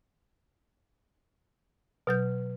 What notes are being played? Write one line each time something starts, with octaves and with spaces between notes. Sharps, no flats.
B2 F#3 B4 G6